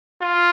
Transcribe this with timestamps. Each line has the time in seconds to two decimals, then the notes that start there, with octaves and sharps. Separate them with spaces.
0.22 F4